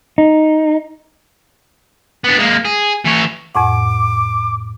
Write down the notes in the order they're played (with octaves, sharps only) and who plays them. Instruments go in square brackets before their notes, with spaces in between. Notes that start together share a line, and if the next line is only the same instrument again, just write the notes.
[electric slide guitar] D#4
[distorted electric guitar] B3 D4
G#3 A#3
G#4
E3 C#5
[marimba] F2 A2 F#5 [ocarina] D6